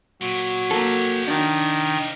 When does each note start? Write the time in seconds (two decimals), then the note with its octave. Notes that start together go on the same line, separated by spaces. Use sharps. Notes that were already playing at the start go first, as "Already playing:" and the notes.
0.22 A#2 F#3
0.71 F3 A#3 G4 A4
1.28 D#3 D4